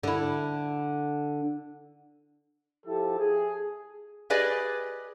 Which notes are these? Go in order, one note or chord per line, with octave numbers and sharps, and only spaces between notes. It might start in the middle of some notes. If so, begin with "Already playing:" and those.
D3 E4
F3 E4 G4 A4
G#4
G4 G#4 B4 D5 D#5 G#5